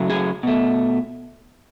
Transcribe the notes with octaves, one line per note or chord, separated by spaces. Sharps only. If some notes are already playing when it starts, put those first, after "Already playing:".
Already playing: C#3 F#3 A3
G#4
B2 A3